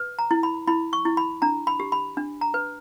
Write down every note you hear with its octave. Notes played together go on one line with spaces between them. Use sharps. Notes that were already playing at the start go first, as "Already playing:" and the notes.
Already playing: B4
A#5
E4
B5
E4 B5
C#6
E4
B5
D4 A#5
B5
G4
B5
D4
A#5
B4